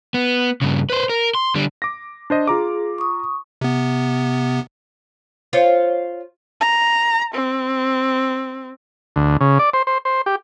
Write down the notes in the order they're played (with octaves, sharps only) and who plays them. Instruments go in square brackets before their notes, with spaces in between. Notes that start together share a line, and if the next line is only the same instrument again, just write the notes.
[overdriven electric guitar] B3
G2 C#3
B4 C5
A#4
C6
D3 G3
[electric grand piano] D6 A#6
D4 C5 D#5
[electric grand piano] F4 A#5 D6 [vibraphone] G#4
[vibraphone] C#6 D#6
[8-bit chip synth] C3 B3
[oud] F4 C5 C#5
[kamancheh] A#5
C4
[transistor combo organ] D2
C#3
D5
C5
C5
C5
G4